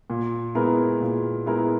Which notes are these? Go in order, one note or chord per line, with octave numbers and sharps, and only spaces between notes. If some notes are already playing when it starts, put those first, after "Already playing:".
A#2
G#3 B3 E4 A#4
A#2
G#3 B3 E4 A#4